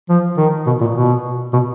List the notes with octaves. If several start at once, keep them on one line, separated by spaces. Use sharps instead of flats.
F3
D#3
B2
A#2
B2
B2